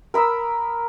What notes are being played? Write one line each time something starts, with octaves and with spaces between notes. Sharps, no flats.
A#4 B5 D#6 E6